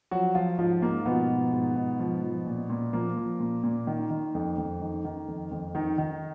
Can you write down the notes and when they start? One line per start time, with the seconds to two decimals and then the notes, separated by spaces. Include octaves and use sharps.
0.11 F3 F#3 F#4
0.35 F3 F4
0.58 G#2 F3 F4
0.82 G#2 A#3
1.06 B2 F3 B3
1.29 F3
1.53 G#2
1.76 G#2
1.99 F3
2.23 F3
2.46 A#2
2.70 A#2
2.93 F3 A#3
3.17 F3
3.40 A#2
3.64 A#2
3.87 D#3
4.11 D#3
4.35 F2
4.58 F2
4.81 D#3
5.05 D#3
5.28 F2
5.51 F2
5.75 D#3 D#4
5.98 D#3